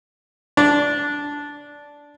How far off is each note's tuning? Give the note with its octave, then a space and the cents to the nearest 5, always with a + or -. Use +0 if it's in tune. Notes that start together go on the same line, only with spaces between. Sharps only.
D4 -10